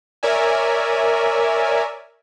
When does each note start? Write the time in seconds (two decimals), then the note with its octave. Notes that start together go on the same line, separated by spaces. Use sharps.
0.23 A#4 C#5 D5 E5 G#5